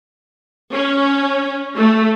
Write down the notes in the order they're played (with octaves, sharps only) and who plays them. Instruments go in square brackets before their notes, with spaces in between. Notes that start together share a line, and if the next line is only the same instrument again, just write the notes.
[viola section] C#4
A3